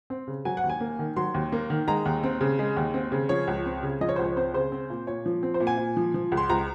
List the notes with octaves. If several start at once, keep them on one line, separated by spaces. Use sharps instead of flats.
C4
C#3
F#3 G#5
F#5
D#2
G#5
A#3
D#3
F#3 C6
D#2
A#3
D#3
G#3 A#5
D#2
C4
C#3
G#3
D#2
C4
C#3
F3 C#5
C#2
C4
C#3
F3 D#5
C#5
C5
C#2
C#5
C4 C5
C#3 C5
C4
A#2
A#2 C#5
F3
C4
C5
A#2
G#5
A#2
F3
F3
C#2
C6
C#2 A#5